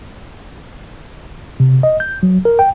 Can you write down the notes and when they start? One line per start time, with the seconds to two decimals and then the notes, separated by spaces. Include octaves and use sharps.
1.60 C3
1.83 D#5
2.00 G6
2.23 F#3
2.45 A#4
2.59 G5